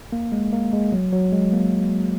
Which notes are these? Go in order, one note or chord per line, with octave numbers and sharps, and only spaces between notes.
A#3
G#3
A#3
G#3
F#3
F#3
G#3
A#3